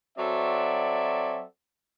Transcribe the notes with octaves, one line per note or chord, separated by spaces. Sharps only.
F#3 C4 F#4 A4 D5 E5